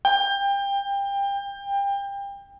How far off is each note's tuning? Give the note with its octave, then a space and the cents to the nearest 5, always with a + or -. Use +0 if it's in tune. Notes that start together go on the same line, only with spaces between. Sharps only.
G5 +25